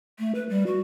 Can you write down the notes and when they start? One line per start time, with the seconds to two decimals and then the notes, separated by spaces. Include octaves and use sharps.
0.19 A3
0.35 B4
0.50 G3
0.67 F#4